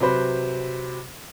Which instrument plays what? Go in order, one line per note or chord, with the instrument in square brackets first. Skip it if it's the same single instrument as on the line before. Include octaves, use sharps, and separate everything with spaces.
[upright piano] C3 F#3 B4 C5 B5